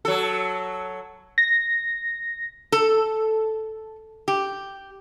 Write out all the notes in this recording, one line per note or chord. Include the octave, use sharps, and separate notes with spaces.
F#3 A4
A#6
A4
G4